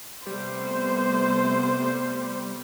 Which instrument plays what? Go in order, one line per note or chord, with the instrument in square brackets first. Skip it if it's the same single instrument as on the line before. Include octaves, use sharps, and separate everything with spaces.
[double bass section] C3 A3 B3 [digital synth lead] G3 [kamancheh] C5